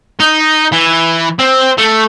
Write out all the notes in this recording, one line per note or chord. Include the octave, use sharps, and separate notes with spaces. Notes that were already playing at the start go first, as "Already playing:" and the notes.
D#4
E3
C4
A3